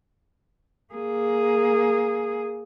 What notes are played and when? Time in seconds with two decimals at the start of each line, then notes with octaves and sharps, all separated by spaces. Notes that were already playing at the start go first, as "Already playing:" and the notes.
0.94 A#3 G#4